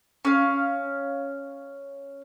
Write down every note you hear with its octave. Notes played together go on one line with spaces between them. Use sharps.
C#4 F5